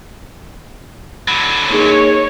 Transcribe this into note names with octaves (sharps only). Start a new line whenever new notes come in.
D3 F#3 B5
A#3 D#4 G#4 C#5